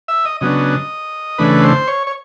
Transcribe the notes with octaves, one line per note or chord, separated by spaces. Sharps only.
E5
D#5
C#3 F#3 B3 D4 D#5
C#3 E3 A3 D4 B4
C5
C#5
C#5